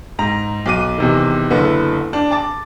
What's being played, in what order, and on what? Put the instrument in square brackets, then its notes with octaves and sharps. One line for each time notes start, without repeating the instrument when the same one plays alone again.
[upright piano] G#2 A#5
B1 D6 D#7
E2 C3 D#3
F#1 D3 B3 E4
D4
A5 D6 A6